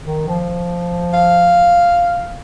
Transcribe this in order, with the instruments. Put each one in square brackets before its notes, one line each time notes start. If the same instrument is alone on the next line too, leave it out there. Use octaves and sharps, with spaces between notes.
[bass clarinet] D#3
F3
[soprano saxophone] F5